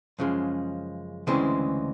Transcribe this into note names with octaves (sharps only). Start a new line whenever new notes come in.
F#2 C#3 F3 G#3
D2 C#3 E3 G#3 C4